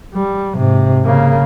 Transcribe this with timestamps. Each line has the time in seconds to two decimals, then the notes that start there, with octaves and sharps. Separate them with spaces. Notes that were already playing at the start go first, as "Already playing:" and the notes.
0.15 G3
0.55 G#2 C3
1.05 C#3 A#3